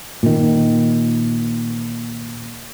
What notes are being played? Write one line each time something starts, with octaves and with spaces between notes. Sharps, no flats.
A#2 D#3